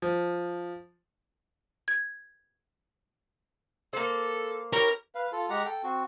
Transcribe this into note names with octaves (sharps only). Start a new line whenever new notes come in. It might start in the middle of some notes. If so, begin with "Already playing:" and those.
F3
G#6
A#3 A4 C5
C#4 E4 G4 A#4
B4 F5
F4 A4
G#3 G4 F#5 A#5
A4 G5
C4 F#4